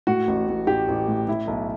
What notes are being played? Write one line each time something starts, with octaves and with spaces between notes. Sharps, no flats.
A2 F#4
A1
A1
A1 G4
A1
A2
A2 E4
B1